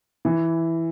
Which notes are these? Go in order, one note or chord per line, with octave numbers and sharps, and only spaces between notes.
E3